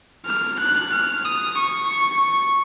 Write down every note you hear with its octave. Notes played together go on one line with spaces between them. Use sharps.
F6
F#6
F6
D#6
C#6